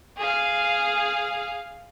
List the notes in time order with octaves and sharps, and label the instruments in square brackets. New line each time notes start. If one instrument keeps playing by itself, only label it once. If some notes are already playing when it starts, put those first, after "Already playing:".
[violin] G#4 F5